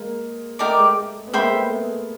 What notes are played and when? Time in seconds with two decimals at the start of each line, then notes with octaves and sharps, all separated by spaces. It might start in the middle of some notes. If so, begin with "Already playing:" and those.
Already playing: G#3 A#3
0.59 A3 D#4 G4 A#4 D5
0.78 G#3
0.97 A3
1.27 B3
1.33 G#3 A#3 C5 E5 G5 B5
1.51 A3 B3
1.70 A3 B3